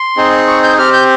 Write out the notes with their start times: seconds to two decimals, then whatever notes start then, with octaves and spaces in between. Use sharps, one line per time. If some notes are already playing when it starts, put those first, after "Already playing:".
Already playing: C6
0.17 C4 D#4 G#4
0.48 C#6
0.63 G6
0.78 C4 G4 F6
0.93 G6